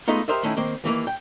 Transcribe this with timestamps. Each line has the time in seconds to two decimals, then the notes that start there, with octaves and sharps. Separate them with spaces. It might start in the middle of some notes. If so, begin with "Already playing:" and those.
0.08 G#3 A3 B3 D#4 F4
0.28 G4 A4 A#4 C5 D#5 E5
0.43 D#3 A3 C#4 D#4 E4
0.57 D#3 A#3 C4
0.84 D#2 E3 A3 A#3
1.07 G5